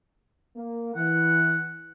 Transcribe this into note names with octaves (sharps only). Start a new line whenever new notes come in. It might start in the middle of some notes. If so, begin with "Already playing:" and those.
A#3
E3 F#5